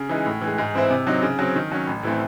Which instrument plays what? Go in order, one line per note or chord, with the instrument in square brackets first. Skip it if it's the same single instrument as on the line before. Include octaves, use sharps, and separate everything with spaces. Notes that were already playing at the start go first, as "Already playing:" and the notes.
Already playing: [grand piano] C#3
E3 G#3 D#4
A2
E3 G#3
G#2
E3 C4 E4 C5
C3
F#3 C4 D#4
C#3
F#3 C4
D#3
F#3 C#4
A1
A2 E3 A3 C4